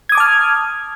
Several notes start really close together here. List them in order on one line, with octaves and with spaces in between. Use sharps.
G#6 D#6 D6 A5 F6